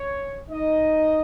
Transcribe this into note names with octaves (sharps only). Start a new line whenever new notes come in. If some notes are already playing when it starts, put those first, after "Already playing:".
Already playing: C#4 C#5
D#4 D#5